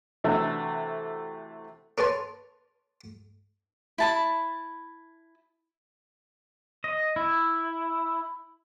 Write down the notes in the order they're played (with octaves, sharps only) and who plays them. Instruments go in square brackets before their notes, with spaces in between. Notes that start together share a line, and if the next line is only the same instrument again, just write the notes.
[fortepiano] C3 E3 A3 D4 F#4 A4
[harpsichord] A#4 B4 C#5 A5 C6
[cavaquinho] E4 A5 B5
[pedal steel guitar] D#5
E4